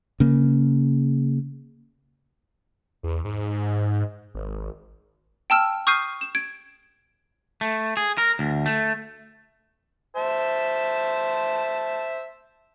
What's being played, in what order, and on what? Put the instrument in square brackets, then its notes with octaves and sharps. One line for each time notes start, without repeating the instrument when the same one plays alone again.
[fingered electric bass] C#3 A#3
[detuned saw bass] E2
G#2
G#1
[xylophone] G5 A5 E6 F6
C#6 D#6 F6 G6 C7 D#7
E7
G#6 D7
[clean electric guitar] A3
G#4
A#4
D2
A3
[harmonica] C5 E5 A5